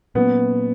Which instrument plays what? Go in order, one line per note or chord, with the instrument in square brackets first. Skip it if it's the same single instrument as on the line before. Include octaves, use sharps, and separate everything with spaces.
[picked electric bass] A#2 F#3 A#3 C#4 [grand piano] B3